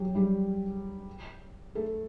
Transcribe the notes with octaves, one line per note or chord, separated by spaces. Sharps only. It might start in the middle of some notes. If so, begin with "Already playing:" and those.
Already playing: F#3 F#4 G4
G3 G4
A3 A4